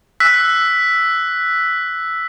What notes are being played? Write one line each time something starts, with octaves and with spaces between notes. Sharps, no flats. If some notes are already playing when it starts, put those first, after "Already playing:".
E6 F#6 B6